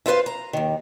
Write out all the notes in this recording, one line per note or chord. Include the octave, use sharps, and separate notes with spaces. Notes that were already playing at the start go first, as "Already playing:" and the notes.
E4 F4 B4 C5 F5
A#5
D#2 D#3